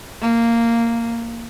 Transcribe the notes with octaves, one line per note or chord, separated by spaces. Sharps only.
A#3